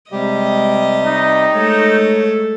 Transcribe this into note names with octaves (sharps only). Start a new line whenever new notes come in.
C3 G3 G#3 G4 D#5
D#4 C#6
G#3 A3 A4 C#5